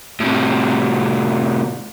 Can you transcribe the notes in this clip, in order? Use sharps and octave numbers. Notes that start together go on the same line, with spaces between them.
A2 C3